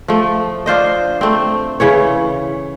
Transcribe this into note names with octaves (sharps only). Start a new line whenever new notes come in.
F3 A3
D4 F4 C5 D#5
A3 C4
C#3 E3 C#5